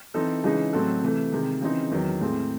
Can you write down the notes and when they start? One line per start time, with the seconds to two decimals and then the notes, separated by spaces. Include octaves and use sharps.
0.14 E3 C4 D#4 A4
0.44 C#3 E3 G#3 D#4
0.73 A2 F#3 C4 F#4 A4
1.03 C3 E3 A3
1.32 C3 D#3 G#3
1.61 C#3 E3 C4 D#4
1.91 E2 D#3 F#3
2.21 A2 G#3 C4